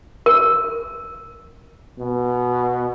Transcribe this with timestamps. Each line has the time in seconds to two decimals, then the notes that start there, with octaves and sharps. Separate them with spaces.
0.26 A#4
1.98 B2